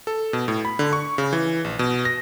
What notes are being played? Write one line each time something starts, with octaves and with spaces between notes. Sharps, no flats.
A4
B2
A2
B5
D3
C#6
C#3
E3
A#1
B2
A#6